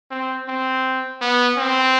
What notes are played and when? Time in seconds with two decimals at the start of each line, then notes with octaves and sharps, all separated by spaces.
0.11 C4
0.48 C4
1.21 B3
1.58 C4